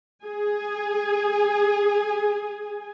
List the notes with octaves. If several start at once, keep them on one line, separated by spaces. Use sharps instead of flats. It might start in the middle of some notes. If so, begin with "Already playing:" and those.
G#4 G#5